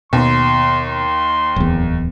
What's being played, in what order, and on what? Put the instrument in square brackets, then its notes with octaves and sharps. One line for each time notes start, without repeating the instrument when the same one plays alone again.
[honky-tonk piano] D#2 [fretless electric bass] B2 [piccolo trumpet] C6
[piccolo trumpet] C6
[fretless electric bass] D1 E2